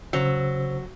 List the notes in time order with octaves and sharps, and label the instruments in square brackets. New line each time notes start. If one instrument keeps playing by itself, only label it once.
[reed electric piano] C#3 C5 E6 [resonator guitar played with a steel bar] F#3